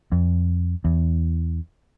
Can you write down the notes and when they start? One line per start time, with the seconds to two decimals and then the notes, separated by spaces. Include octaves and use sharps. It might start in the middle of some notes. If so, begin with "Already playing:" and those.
0.12 F2
0.85 E2